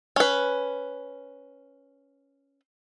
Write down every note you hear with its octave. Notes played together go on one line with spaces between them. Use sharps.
C#4 B4